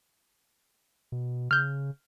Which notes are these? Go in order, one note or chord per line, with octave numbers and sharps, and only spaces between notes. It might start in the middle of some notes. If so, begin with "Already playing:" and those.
B2
C#3 F6 G6